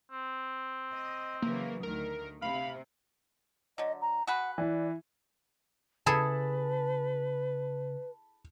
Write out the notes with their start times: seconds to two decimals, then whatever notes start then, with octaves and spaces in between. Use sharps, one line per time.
0.12 C4
0.93 D#5
1.42 C#3 E3 F#3 A#3
1.83 D2 D#3 A#4
2.42 C3 F5 B5
3.78 D3 F#3 D#5
4.01 A#5
4.27 F#4 G#4 B4 F#5
4.58 E3 D5
6.06 C#3 E4 G#4 A4 B4 A5 B5